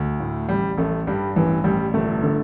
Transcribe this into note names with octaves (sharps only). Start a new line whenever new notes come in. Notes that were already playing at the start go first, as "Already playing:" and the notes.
Already playing: D2
A2
A1 G3
A1 A3
G2 G3
A1 E3
A1 G3
G1 A3
D3